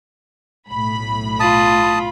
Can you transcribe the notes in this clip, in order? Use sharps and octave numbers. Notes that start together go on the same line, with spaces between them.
B1 A2 B5
F4 A5 D#6